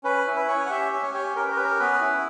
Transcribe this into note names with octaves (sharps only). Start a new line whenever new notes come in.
C#4 B4
E4
B4
C#4 C#5
F#5
G4 E5
C#4 E5
C#5
G4 C#5
G4 A#4
B4
A#4
C#4 B4
A#4
B3 B4
E4